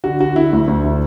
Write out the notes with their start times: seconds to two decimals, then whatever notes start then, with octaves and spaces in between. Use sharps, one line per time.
0.04 D3 F#4
0.20 D3 F#4
0.36 D3 E4
0.53 D2
0.68 D2
0.84 D3